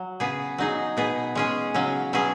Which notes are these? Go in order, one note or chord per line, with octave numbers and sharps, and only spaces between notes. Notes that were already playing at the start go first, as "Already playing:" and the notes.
Already playing: F#3
C#3 B3 G#4
F#3 D#4 G#4
B2 B3 G#4
G#3 C#4 G#4
C#3 F#3 C#4
B2 F#3 C#4 G#4